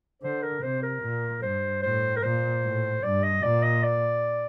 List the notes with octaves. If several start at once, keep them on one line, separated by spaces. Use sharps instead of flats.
D3 C5
A#4
C3 C5
A#4
A#2
G2 C5
A2 C5
A#4
A#2 C5
A2
G2 D5
D#5
A#2 D5
D#5
D5